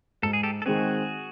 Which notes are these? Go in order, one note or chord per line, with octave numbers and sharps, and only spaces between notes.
G#2 A4
G#4
G4 A4
A4
D#3 G#3 C4 F#4 G#4